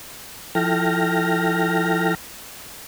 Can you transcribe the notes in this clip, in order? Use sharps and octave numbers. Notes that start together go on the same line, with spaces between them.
F3 E4 A4 G5 F6 A#6